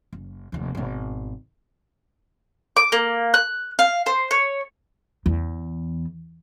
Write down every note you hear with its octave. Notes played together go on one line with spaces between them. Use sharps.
F#1
F1 D#2
G#1 B2
D6
A#3
F#6
F5
C5
C#5
E2